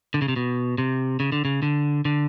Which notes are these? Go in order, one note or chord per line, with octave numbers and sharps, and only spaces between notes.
D3
C#3
C3
B2
C3
C#3
D3
C#3
D3
D3